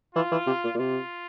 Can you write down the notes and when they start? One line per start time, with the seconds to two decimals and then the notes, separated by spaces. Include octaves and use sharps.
0.15 E3 F4
0.32 E3
0.47 C3
0.64 A#2
0.75 A#2
0.79 C3 F4